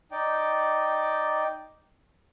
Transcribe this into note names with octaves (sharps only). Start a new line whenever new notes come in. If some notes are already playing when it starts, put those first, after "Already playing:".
D#4 D5 G5